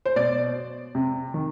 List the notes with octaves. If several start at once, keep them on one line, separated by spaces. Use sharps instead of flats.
C5
B2 D5
C3
D#3